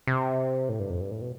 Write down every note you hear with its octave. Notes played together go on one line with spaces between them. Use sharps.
C3
A2
G2
F2
G2
A2
B2